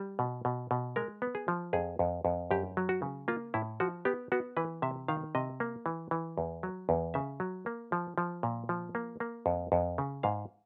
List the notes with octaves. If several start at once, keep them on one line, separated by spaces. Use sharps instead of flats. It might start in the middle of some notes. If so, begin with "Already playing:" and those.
Already playing: G3
B2
B2
B2
G#3 A#4
B3
G#4
F3
F2 G#4
F2
F2
F#2 G4
F#3
F#4
C#3
A#3 F4
A2 E4
F3 F#4
B3 G4
B3 F#4
E3 B4
C3 E5
D#3 F5
C3 D#5
A#3
E3
E3
E2
F#3
E2
C#3 E5
F#3
A#3
F3
F3
A#2
F3
A#3
A#3
F2
F2
C#3
G#2 F5